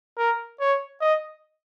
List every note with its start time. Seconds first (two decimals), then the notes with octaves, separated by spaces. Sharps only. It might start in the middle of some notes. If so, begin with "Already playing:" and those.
0.18 A#4
0.60 C#5
1.01 D#5